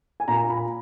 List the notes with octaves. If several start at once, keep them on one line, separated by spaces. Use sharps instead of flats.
G#5
A#2 A#5
B5